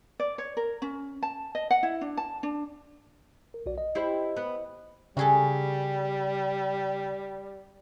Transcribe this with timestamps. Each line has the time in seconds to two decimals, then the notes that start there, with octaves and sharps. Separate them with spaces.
0.20 D5
0.38 C#5
0.57 A#4
0.82 C#4
1.22 A5
1.55 D#5
1.71 F#5
1.83 E4
2.01 D4
2.17 A5
2.43 D4
3.54 A#4
3.66 B1 F#4 D5
3.78 D#5
3.95 E4 G4 C5
4.37 B3
5.17 C#3 G3 F#4 G#4 A4